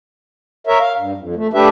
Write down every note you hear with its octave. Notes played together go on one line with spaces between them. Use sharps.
A#4 C#5 E5
F5
G2
F2
A3
A3 D4 G4 B4 E5